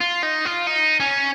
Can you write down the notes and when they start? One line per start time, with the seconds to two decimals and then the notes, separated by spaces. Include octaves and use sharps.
0.01 F4
0.23 D#4
0.45 F4
0.67 D#4
1.00 C#4